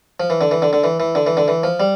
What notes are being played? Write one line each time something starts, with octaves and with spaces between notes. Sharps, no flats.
F3
E3
D3
E3
D3
D3
E3
E3
D3
E3
D3
E3
F3
G3